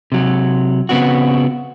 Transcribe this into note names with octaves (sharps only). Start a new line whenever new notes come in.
C3 F#3
C#3 B3 C4 F#4